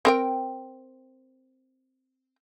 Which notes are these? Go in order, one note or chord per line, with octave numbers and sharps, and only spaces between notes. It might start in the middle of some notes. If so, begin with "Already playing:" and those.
C4 A#4 G5